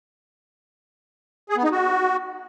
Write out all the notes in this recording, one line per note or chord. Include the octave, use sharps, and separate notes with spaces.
G#4
B3
D#4
F#4